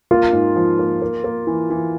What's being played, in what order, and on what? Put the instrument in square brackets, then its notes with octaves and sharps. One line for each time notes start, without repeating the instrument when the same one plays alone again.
[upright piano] A#3 [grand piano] F4
[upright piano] G#2
F3
A#3
A#3
A#3
E3
E3